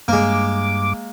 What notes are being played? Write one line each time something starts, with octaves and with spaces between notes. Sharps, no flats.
G2 G#3 A#3 D6